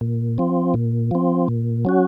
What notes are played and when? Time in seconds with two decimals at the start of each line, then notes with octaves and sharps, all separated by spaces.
0.01 A#2
0.38 F3 C4
0.74 A#2
1.11 F3 C4
1.48 A#2
1.85 F#3 C#4 F#4